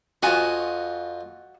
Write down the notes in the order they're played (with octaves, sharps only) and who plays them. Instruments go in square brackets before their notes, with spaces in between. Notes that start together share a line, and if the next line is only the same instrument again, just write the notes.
[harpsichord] F2 F4 D#5 [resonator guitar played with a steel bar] F#4 G#5